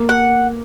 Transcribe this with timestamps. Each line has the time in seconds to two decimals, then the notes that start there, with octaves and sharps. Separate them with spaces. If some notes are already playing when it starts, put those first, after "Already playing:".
Already playing: A#3
0.09 F#5